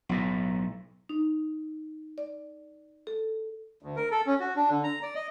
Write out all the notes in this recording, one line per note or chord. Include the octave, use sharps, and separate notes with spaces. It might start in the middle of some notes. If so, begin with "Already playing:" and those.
B1 A2
D#4
D5
A4
D2
A#4
A4
C#4
F#4
D4
D3
A#5
D5
D#5